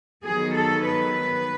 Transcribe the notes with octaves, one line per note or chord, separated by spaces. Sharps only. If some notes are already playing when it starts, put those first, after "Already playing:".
D#3 F#3 B3 G#4
A4
B4